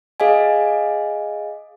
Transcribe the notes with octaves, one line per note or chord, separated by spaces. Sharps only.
G#4 D#5 F5 G#5